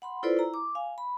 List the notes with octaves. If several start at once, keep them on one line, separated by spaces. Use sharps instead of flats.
F#5 B5 C6
E4 F4 A4 B4 C5 D5
E4 A#5
D6
F5 G#5
B5